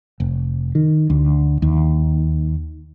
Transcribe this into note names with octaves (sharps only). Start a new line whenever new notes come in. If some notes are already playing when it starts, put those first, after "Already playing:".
F1
D#3
D2
D#2